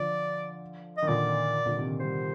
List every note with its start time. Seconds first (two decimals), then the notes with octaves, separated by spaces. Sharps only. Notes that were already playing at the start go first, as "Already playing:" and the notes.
Already playing: D3 F3 D5
0.97 D#5
1.02 D#3
1.08 A#2 D3 D5
1.66 A#2 D3
1.77 C3 D#3
2.00 D#3 G3 C5